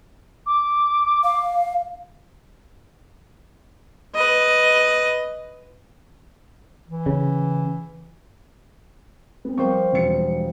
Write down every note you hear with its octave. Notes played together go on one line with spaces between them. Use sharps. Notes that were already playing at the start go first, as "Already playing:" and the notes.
D6
F5
B4 D#5
E3
C#3
B3 C4
F3 G3 A#4 C5 C#6
E1 C#7